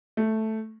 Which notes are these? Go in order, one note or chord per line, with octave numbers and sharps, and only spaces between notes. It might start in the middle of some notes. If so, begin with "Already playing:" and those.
A3